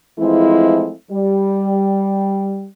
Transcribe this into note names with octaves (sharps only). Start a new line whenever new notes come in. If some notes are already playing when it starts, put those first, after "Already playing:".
E3 F3 G#3 A3 C4 E4
G3